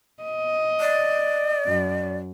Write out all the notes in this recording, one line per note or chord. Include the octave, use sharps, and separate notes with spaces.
D#5
D5
F#2